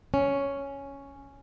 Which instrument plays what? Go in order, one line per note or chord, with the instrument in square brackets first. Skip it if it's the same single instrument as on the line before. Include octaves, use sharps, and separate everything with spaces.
[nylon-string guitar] C#4